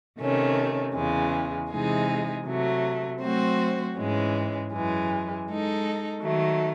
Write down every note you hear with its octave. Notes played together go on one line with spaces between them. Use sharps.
C3 D#3 A3 C#4
E2 C#3 E3 G#3
C3 E3 G#3 D#4 G#4
C3 F#3 A3
F#3 A3 C4 F#4 C5
G#2 E3 G#3 C#4
F#2 E3 G#3
G#3 D#4 A4
D#3 F#3 A3